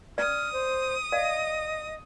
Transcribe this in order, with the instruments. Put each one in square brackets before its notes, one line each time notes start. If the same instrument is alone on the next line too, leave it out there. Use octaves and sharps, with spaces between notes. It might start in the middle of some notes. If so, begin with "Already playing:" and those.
[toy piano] C#4 D5 [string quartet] D#6 [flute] F6
[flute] C5
[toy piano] D5 F5 [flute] D#5